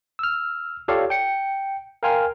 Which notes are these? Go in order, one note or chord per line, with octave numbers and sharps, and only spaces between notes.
E6 F6
F4 G4 A4 C#5 D5 F5
G5 C#7
A#4 F5 G5 G#5 C6 F6